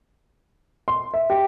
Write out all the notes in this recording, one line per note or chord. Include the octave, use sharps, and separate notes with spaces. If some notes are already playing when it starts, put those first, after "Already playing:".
C6
E5
G4